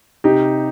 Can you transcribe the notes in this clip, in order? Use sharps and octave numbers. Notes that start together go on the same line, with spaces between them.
C3 D#4 G4